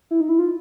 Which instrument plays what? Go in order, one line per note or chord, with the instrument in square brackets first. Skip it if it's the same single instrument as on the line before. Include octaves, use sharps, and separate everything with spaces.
[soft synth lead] E4
D#4
E4
F4